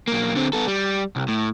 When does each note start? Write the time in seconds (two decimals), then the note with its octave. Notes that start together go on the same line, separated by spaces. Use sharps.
0.08 B1 A#3
0.35 D3 C4
0.53 B3 A4
0.67 G3
1.16 C2
1.28 A2